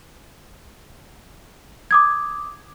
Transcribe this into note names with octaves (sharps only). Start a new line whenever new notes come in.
D6 D#6 G#6